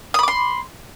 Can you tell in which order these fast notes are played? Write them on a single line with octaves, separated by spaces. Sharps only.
D#6 B5 D6 C6